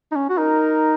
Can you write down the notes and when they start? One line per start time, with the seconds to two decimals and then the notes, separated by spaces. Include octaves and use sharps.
0.12 D#4
0.16 C#4
0.29 F#4
0.38 D#4 A#4